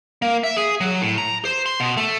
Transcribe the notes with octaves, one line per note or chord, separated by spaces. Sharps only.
A#3
E5
G#4
F#3
A2
A#5
C5
C6
B2
A3